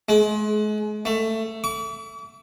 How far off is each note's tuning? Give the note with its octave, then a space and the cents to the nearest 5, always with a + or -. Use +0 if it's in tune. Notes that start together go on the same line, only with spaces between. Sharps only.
G#3 +35
A3 +15
D6 -45